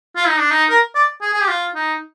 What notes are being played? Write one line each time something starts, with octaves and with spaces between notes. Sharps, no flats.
F4
D#4
D4
D#4
A#4
D5
G#4
G#4
G4
F4
D#4